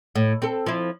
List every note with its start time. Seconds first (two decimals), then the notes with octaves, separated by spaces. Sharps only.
0.16 A2
0.42 C4 A4
0.66 F3 E4